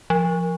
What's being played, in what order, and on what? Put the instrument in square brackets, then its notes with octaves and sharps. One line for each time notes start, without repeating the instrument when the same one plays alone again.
[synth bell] F3